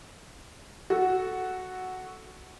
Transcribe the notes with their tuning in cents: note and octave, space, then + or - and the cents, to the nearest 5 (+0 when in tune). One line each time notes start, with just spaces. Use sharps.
F#4 +0 A4 -10